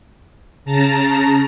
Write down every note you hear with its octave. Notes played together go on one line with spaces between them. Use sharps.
C#3 A5 A#5